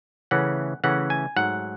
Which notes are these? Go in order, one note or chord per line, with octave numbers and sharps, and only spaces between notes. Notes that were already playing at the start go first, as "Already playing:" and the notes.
C#3 E3 A3 C#4 F#5
C#3 E3 A3 C#4 F#5
G#5
G#2 F#3 A3 F#5